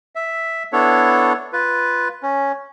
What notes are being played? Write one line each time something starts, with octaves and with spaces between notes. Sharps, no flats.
E5
B3 D4 E4 A4 C#5
F4 B4
C#4